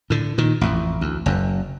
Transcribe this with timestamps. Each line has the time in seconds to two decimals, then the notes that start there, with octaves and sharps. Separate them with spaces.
0.10 A2 D3
0.38 A#2 D#3
0.61 A1 F2
1.01 D2
1.26 F#1 F#2